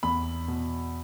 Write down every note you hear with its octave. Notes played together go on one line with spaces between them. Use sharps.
E2 B5
B2